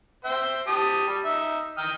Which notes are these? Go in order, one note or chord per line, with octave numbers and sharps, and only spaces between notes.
C5 E5 G5
G4 A5 D#6
G3
D#4 E5
G5 D#6 F6